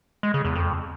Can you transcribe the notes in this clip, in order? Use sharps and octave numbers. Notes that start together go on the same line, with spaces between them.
G#3
C#3
E2
F2